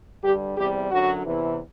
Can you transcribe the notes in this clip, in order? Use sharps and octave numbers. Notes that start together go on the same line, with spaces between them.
G2 D3 G3 G4
E2 C3 G3 G4
F#2 D3 F#3 F#4
E2 C3 E3